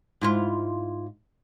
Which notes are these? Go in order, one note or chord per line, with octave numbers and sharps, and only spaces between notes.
G#2 E4 F4